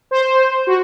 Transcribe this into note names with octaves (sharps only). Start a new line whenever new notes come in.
C5
F#4